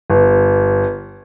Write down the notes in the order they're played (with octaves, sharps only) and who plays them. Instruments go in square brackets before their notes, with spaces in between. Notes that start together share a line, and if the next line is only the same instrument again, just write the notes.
[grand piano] G1